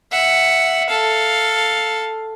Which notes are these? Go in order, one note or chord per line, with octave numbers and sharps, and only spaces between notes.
E5 F#5
A4 F5